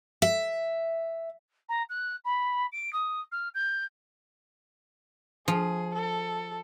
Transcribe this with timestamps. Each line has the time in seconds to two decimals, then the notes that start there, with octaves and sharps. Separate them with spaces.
0.22 E5
1.69 A#5
1.89 F#6
2.25 B5
2.72 D7
2.93 D#6
3.31 F6
3.54 G6
5.48 F3 G#4
5.95 A4